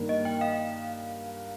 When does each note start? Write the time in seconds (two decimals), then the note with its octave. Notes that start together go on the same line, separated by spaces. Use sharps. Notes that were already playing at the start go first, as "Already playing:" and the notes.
Already playing: G2 D#3 A#3
0.09 D#5
0.25 G5
0.41 F5